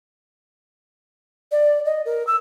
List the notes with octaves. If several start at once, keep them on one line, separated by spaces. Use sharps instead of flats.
D5
D#5
A#4
E6